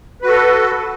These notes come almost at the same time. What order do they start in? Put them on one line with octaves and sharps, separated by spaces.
B4 F#4 A4